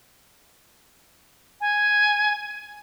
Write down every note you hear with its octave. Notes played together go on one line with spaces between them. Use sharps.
G#5